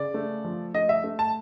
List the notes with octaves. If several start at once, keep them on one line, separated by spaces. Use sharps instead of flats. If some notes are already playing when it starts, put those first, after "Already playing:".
Already playing: C#3 D5
A3
F3
A3 D#5
E5
A3
A5